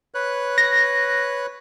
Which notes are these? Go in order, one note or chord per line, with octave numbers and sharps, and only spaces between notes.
B4 C#5 F#6
A#6